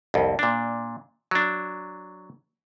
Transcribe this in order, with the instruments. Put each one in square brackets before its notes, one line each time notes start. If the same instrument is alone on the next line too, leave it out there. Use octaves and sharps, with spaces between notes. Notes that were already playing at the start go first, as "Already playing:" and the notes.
[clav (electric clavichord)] C2 F2
A#2 D4
F#3 D4